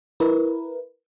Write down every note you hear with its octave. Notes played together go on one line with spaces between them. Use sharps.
E4 A#4 B4